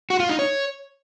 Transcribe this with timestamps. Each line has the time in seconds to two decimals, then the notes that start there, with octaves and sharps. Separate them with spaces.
0.10 F#4
0.20 F4
0.29 D#4
0.39 C#5